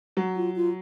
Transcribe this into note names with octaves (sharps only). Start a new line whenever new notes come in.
F#3
F4
F4